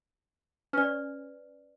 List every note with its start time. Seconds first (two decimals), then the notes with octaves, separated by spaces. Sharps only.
0.73 C#4 B4 D5